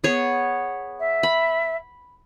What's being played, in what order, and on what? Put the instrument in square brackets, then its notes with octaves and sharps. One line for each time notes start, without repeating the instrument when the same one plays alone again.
[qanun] B3 G#4 C#5
[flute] E5
[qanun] B5